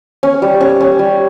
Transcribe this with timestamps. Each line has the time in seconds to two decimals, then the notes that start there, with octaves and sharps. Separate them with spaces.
0.23 C#4
0.42 G3
0.61 C#4
0.80 C#4
0.99 G3